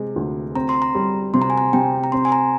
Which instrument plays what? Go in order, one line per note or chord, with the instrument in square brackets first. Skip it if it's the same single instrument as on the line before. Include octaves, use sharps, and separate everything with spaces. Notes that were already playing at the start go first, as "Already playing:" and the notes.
Already playing: [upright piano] C3 G#3
D2
[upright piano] C4 [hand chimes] A#5
[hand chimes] C6
A#5
[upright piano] G3
[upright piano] C3 [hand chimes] C6
[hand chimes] A#5
G#5
A#5
[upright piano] C3 [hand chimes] G5
[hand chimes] A#5
[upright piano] C4 [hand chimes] C6
[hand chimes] G#5
A#5